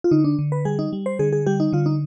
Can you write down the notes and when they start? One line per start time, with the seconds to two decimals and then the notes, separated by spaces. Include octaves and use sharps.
0.04 F4
0.11 D3 D#4
0.24 D4
0.39 D3
0.52 B4
0.65 G3 G#4
0.79 D#4
0.93 G3
1.06 C5
1.19 D3 G#4
1.33 G#4
1.46 G3 G4
1.60 D#4
1.73 D3 F4
1.86 D#4